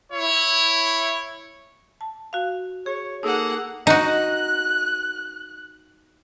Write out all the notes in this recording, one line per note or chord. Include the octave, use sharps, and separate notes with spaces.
E4 C#5
A5
F#4 F5
G#4 C#5
A#3 D#4 G#4 A4 F#5
D#4 F#4 F#6